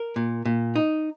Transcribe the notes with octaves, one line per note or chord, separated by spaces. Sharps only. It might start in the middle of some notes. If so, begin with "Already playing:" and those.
Already playing: A#4
A#2
A#2
D#4